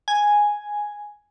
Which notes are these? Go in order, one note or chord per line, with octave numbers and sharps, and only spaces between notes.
G#5